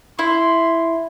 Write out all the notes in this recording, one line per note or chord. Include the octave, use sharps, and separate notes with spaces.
E4 C6